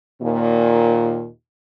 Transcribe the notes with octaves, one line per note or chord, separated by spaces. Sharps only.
D#2 A#2